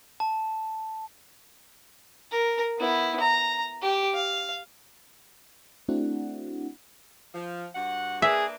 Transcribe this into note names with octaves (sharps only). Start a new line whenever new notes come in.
A5
A#4
B3 E4
A#5
G4
F5
A3 C4 D4 E4 F#4 F#5
F3
G2 F#4 F#5
A#3 D4 G#4 B4 E5